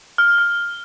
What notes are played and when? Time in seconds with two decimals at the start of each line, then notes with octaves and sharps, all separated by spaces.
0.18 F6
0.38 F6